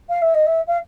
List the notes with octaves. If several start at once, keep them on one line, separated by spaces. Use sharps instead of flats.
F5
E5
D#5
E5
F5